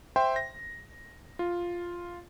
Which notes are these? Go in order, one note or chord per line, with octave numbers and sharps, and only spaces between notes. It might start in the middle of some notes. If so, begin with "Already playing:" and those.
C5 E5 G5 C6
A#6
F4